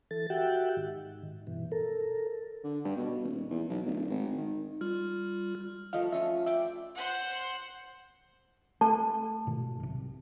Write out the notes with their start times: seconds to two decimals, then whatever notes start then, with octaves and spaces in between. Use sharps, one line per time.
0.11 E3 A4 A6
0.30 F#4 G4 E5 F#5 G5
0.77 G#2 D#3
1.47 G2 B2 E3
1.72 A4 A#4
2.64 D3
2.85 G2
2.97 B2
3.23 D#1
3.50 E2
3.69 B1
3.86 D1
4.10 G#1
4.38 D#3
4.81 G3 F4 F6
5.93 F3 A3 F4 A#4 D#5 F5
6.12 A3 C#4 F4 E5
6.46 D5 E5 G5 D6
6.95 C5 F#5
8.81 A3 A4 A5
9.47 G#2 B2 D#3
9.80 B1 C3